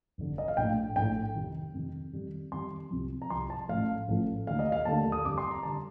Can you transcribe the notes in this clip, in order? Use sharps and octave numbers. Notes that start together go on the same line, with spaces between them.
F1 F2 D3
D#5
F5
A#1 A2 A3 G5
A#1 A2 A3 G5
F2 C3 D#3
F2 C3 D#3
F2 D#3 G3
F2 D#3 G3 C6
C2 C3 F3
A#5
C2 C3 F3 C6
A5
A1 A2 F3 A3 F5
A1 A2 F3 A3
D#2 D3 A3 F5
D#5
F5
D#2 D3 A3 A5
D#6
F2 D3 G3 D6
C6
A#5
D3 G3 A5